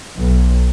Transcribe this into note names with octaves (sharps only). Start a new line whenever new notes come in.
B1